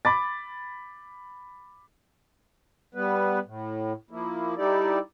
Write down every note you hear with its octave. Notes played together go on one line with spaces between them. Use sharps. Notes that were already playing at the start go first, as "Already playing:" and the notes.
B5 D6 A6
G3 B3 B4
A2
F3 A#3 E4
G3 D#4 E4 G4 A4 D5